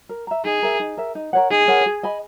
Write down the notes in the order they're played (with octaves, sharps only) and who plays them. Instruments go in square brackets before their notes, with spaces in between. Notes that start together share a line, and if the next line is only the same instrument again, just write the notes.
[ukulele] A#4
E5 A#5
[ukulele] D#4 [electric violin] G#4
[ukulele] A#4 E5
D#4
A#4 E5
D#4
A#4 C#5 F#5
[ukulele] D#4 [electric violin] G#4
[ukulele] A#4 C#5 F#5
G#4
D#5 G#5 B5